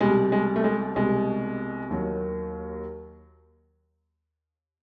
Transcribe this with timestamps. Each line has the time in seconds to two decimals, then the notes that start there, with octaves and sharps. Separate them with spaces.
0.01 C2 B2 G3 G#3
0.32 G#3
0.56 A3
0.64 G#3
0.96 C2 B2 G3 G#3
1.90 D#2 D#3 F#3